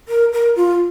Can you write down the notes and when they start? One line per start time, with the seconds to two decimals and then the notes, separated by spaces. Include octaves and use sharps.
0.09 A#4
0.33 A#4
0.56 F4